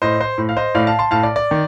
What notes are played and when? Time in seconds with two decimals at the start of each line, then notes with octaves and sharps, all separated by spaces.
0.02 A2 C5 D#5
0.20 C5
0.38 A2
0.49 F5
0.57 C5 D#5
0.75 A2 D5 F5
0.87 F5 A5
0.99 A5 C6
1.11 A2 F5 A5
1.23 D5
1.36 D5
1.51 D#3